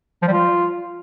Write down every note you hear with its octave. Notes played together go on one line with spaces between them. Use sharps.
F3
G3
F4